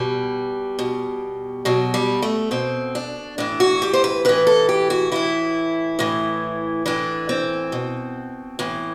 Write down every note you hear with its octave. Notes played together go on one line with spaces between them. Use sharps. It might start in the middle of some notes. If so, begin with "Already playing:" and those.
Already playing: B2 G3
B2
B2 F#3
G3
A3
B2 C4
D4
A2 E3 D4
F#4
G4
C5
B4
A2 E3 B4
A4
G4
F#4
A2 E3 E4
A2 E3
A2 E3 D4
C4
B2
A2 E3